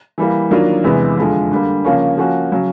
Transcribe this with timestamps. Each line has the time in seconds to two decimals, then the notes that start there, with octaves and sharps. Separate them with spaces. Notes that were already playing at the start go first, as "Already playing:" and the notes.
0.18 E3 G3 A#3
0.51 D#3 F#3 A#3 D4 F4
0.84 E2 C3 E3 G#3 B3
1.18 F2 D3 F3 G#3
1.51 D3 G3 A#3
1.85 C#3 F3 A#3 C#4
2.18 F3 A#3 C#4 F#4
2.52 C#3 F#3